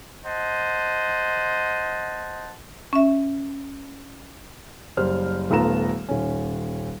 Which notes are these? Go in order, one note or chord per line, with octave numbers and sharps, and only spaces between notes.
C5 D#5 F#5 A5
C#4 E5
F#1 G3 C5 F6
D#1 A3 B3 F4 A#5 E7
D#1 C#4